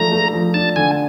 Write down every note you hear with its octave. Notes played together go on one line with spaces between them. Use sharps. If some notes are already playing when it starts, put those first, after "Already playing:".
Already playing: F3 A3 D4 A#5
A3
F3
D4 A5
D3 G#5